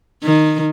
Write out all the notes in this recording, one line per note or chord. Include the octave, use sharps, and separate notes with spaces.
D#3